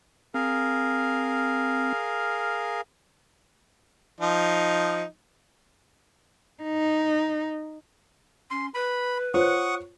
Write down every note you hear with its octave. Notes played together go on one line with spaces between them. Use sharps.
C4 G#4 A#4 F5
F3 D#4
D#4
C#4 C6
B4 B5
F4 C5 C#5 F#5 C#6 D#6